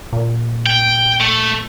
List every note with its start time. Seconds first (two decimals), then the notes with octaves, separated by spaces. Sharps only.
0.13 A#2
0.66 G5
1.20 A3